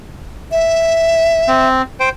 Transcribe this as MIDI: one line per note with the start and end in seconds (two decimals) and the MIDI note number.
0.52 1.68 76
1.48 1.82 60
2.00 2.09 72
2.00 2.09 79